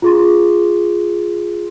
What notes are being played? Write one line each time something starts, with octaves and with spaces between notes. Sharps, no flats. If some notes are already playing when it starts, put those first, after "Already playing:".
F4 G#4 C6